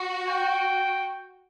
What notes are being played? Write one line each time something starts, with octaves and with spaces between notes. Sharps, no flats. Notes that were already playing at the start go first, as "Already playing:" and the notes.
Already playing: F#4
G5